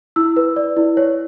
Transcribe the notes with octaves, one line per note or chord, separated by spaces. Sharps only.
E4 E6
B4
D5
E4
C#5